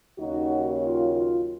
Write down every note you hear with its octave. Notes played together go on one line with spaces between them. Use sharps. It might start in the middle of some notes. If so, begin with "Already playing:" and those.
D#2 C#3 F#3 D#4 F#4
F4
F4